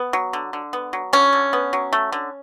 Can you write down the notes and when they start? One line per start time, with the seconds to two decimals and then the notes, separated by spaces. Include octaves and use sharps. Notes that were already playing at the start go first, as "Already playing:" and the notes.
Already playing: B3
0.13 F#3
0.33 D3
0.53 D3
0.73 B3
0.93 F#3
1.13 D3 C#4
1.33 D3
1.53 B3
1.73 F#3
1.93 A3
2.12 D3